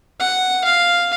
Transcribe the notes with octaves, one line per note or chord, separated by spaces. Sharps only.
F#5
F5